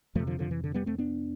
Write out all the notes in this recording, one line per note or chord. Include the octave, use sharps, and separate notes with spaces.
F2 C3 F3 A3
D3 F3
D3 F3
E3
D3
G3 B3
A3 C4
B3 D4